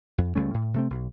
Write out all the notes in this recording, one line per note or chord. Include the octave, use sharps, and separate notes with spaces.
F2
C#2 G3 A3 C#4
A2
C3 A3 C4
B1